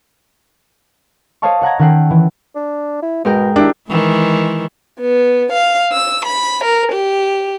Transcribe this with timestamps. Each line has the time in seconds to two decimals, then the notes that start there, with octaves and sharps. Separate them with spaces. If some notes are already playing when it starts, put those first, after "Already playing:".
1.42 C5 C#5 D#5 F5 A5 C#6
1.61 C#5 F#5 A#5 G#6
1.79 D#3 C#4 A4 F#5 G5 C7
2.10 E3
2.55 D4
3.02 E4
3.25 G#2 B2 A#4 G5
3.56 D#3 D4 E4 G4
3.88 D#3 E3 G#3
5.00 B3
5.52 F5
5.92 E6
6.25 B5
6.64 A#4
6.92 G4